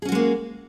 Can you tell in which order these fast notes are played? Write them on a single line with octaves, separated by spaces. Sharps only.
G#4 C#4 F#4 G#3 A#3